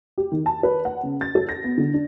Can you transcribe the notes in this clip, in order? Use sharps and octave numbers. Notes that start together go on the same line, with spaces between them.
G4
D#3
A5
B4
F#5
C#3
A6
A4
A#6
B3
D3
D4